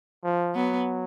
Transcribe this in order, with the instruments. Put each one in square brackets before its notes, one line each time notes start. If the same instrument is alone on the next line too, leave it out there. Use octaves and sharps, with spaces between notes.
[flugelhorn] F3
[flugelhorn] F#3 [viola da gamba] B3